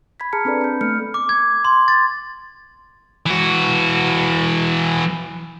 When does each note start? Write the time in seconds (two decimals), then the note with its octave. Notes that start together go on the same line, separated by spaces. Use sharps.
0.20 B5 G#6 B6
0.33 G#4 A5 A#5 F6 C#7
0.45 C4 D4 A4 B4 D5
0.61 B5 G6
0.81 A3 B3 A4 F6 C#7
1.14 D6
1.29 G#6
1.65 C6
1.88 A6
3.26 E3 F#4